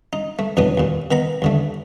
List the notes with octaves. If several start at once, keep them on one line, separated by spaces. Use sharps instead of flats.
D#4
A3
E2 B2 F#3 B3 D4 D#6
D#2 A#2
D#3 B3 A#5 B5
D#2 D3 A3